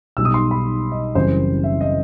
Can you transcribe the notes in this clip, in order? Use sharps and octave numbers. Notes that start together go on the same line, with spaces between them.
B1 B2 G3 D#4 E6
D#6
C6
B5
D#5
F#1 F#2 E3 G3 C4 C5
E5
D#5